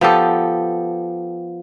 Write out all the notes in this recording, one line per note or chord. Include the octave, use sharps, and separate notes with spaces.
F3 B3 G4 A4